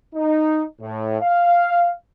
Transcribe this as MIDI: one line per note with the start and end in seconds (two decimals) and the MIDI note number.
0.15 0.63 63
0.81 1.17 45
1.21 1.91 77